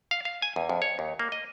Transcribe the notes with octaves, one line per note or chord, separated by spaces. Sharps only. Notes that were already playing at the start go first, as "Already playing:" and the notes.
F5
F5
G#5
E2
F2
C#5
D#2
A#3
D#5